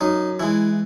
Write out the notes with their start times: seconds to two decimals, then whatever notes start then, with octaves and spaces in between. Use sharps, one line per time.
0.01 F#2 D#4
0.39 E3 G#3 E4